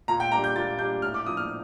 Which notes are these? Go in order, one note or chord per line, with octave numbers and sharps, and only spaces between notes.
A#2 A#5
G5
G3 A#3 D4 A#5
G6
A#2 A6
G3 A#3 D4 G6
A2 F6
D6
F3 A#3 D4 D#6
F6